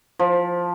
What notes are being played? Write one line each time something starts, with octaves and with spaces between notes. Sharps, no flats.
F3